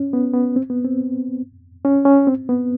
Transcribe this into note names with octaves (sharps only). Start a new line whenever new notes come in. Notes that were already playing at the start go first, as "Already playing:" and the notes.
Already playing: C#4
B3
B3
C4
B3
C4
C#4
C#4
C4
B3